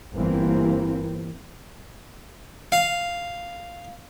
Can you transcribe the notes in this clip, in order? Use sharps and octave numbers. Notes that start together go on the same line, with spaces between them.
G1 E3 A#3 C4
F5